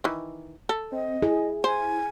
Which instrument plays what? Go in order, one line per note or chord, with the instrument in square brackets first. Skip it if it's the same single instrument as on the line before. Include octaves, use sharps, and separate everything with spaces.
[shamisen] D#3 E3
A4
[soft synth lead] C4 [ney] D#5
[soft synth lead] E4 [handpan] G#4
[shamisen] C5 [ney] G#5